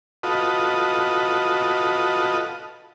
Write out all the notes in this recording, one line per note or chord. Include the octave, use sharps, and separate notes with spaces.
F4 F#4 A4 B4 D#5